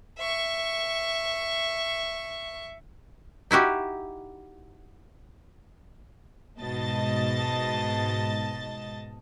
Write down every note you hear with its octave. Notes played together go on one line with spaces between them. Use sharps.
E5 C#6
D#4 E4 F#4 G4
G#2 B2 D#5 A5 A6